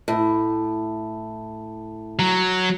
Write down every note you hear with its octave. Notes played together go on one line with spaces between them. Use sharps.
A2
F#3